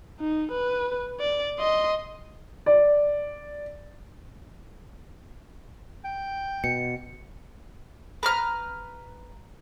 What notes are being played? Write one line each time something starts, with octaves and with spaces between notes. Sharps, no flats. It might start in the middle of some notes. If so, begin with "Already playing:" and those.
D#4
B4
D5
D#5 C6
D5
G5
B2 C#7
B4 A#5 F6